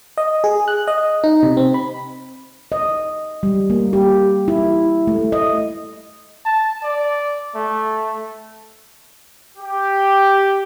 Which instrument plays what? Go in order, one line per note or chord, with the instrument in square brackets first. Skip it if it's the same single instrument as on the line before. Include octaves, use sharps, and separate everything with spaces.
[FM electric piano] D#5
G#4
F#6
D#5
D#4
C3
C4
B5
[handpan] D#5
G3
A#3
G4
E4
A3
D#5
[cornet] A5
D5
A3
[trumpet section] G4